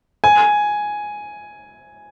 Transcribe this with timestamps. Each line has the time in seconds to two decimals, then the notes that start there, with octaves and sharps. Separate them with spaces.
0.24 G#5